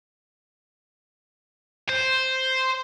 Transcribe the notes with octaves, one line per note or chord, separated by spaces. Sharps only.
C5